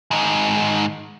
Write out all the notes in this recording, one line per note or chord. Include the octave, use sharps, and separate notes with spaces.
G#2 D#3